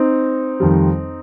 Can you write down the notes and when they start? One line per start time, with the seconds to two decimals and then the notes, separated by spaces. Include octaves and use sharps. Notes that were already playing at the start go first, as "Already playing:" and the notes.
Already playing: C4 D#4
0.60 F2 D#3 G3